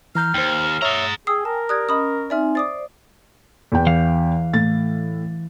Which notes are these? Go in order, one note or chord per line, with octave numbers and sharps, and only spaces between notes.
E3 A#5 F6 G6
D#2 C5 G5
G#4 C#5 E5 A#5 E6
G#4 G5 G#5 D#6 E6 C7
A#4 A5
G4 D5 D#6 F#6 G#6
C#4 D#5 B5 D#6
C4 D#4 D5 E5 G#5 F6
C5 D5 D6 D#6 A6
E2 G5
E3 F5
A2 A6